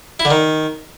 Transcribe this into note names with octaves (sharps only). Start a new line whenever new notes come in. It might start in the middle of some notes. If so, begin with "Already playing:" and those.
E4
D3
D#3